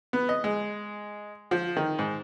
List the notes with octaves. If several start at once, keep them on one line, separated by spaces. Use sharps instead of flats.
B3
D#5
G#3
F3
D#3
G#2